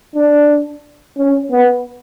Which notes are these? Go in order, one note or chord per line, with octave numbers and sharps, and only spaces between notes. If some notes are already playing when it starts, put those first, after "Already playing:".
D4
C#4
B3